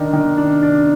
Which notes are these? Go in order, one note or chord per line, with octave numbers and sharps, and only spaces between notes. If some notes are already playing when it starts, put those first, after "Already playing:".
Already playing: D#3 D4
D#3
D4
D4